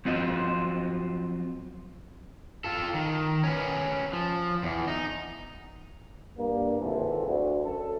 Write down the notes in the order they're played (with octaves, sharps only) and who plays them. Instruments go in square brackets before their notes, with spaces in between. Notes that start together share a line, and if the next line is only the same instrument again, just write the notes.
[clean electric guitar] F3 F#3 C4 F4 F#4 D#5
[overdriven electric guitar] F4 A4
D#3
C#4 B4
F3
E2
D#4
[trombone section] G2 A#3
G#1 C3 E3 F4 A4
D2
F#2 A4